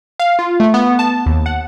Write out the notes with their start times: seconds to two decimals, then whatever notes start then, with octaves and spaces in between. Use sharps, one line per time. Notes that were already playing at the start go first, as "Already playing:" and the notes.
0.19 F5
0.39 F4
0.60 A3
0.74 B3
0.99 A5
1.26 D#2
1.46 F#5